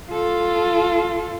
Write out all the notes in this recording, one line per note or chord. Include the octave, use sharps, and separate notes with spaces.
F4 A4